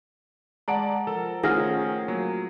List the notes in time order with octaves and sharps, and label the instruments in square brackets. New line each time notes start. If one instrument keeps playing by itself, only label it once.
[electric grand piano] G#3 D5 D7 [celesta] F#5 A5 A#5
[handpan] F3 A#4 [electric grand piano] A4
[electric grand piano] D#3 [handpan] A3 C#4 F4 [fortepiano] G#4 [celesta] F#5 F6 A#6
[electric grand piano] F#3 [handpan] A#3